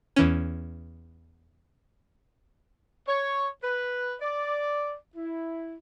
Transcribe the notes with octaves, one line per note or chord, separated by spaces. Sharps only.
E2 E3 C#4
C#5
B4
D5
E4